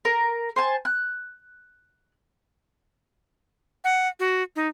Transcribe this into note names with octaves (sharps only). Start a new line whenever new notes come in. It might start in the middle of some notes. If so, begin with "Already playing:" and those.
A#4 A#5
C5 G#5 A5
F#6
F#5
F#4
D#4